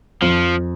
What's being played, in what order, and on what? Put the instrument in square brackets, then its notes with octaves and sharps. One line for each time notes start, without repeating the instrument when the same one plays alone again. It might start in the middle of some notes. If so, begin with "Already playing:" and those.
[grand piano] F2 [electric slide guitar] F3